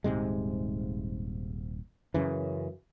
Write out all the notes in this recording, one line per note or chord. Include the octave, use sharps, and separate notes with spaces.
D#1 G#2 C3 G#3
F#2 C#3 E3